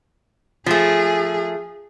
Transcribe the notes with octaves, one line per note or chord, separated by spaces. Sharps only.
F3 A3 G#4